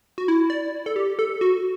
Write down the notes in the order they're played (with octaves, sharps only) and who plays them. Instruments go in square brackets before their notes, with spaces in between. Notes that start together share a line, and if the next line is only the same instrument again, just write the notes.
[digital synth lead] F#4
E4
D5
A4
G4
A4
F#4